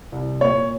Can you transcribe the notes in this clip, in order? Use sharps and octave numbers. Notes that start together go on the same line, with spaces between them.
C2
A#2 C#5